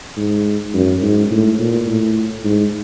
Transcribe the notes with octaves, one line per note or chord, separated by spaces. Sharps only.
G#2
F#2
G#2
A2
A#2
A2
G#2